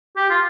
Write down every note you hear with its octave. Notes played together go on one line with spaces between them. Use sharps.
G4
F4